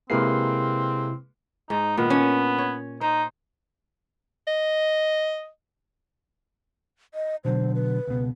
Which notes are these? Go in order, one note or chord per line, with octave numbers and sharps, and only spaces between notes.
C3 G#3 A#3 C4 E4 B4 C7
G#2 D#4
A#2 D#3 B3
C#4 D4
C#5
D#4 C5
D#5
D#5
B2 D3 F#3 C5
B4
C#2 B2